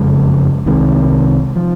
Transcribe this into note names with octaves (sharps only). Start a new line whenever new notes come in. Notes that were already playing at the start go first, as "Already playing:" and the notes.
Already playing: F#1 F2 C#3 G#3
C2 C3 D#3 G#3
F3